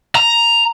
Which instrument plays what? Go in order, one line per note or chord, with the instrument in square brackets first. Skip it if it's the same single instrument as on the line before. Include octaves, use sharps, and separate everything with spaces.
[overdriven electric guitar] A#5